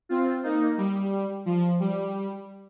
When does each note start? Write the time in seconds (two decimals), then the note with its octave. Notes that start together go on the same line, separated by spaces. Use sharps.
0.09 C4 F4
0.43 A#3 D#4
0.78 G3
1.46 F3
1.80 G3